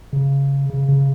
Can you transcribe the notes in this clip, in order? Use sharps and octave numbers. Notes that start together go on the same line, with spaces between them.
C#3
C#3
C#3